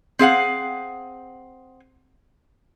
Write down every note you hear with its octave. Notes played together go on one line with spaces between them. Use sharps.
C4 G#4 F5 F#5